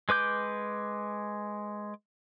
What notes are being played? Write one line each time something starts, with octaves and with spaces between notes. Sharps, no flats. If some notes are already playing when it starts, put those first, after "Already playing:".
G#3 B4 D6 G6